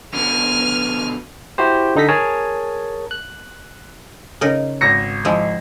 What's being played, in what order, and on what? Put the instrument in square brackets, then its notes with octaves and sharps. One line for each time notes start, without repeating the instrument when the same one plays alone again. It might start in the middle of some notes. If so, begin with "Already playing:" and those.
[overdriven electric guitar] B2 D3 [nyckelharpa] G#5 [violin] F6
[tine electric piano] E4 F#4 G4 C5
D3 D#4 A4 A#6 B6
G#4 A#4 C#5 G#5 A5
F#6
[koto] C#3 D#4 A#4
[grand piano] G#1 A#6 C#7
[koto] F3 G#3 E4